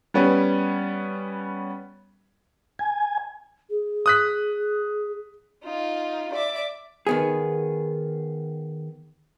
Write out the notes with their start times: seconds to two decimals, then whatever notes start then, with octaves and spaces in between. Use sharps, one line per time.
0.14 G3 B3 C#4
2.79 G#5
3.70 G#4
4.06 D#6 F#6 B6
5.65 D#4 F4
6.34 D5 E5 D6
7.07 D#3 B3 G#4